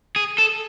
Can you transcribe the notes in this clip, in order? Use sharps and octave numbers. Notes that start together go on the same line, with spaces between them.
G#4
A4